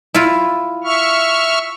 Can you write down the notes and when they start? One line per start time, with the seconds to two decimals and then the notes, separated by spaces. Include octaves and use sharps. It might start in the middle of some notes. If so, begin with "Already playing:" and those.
0.14 E4 F4
0.84 E5 C#6 F6